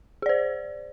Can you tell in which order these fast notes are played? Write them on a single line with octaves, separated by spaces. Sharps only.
G#4 D5 C5